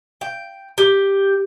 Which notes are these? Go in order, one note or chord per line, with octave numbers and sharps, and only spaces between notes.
G5
G4